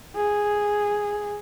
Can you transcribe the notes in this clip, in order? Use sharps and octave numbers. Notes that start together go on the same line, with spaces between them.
G#4